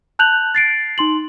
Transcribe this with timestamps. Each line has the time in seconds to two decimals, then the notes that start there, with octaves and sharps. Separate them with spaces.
0.19 A5 F#6 G6 F7 F#7
0.55 A6 C7 D7
0.98 D#4 C6 F#7